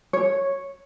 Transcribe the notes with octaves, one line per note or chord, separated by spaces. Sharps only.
C#5